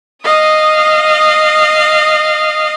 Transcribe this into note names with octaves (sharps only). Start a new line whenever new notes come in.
D#5 F5 D#6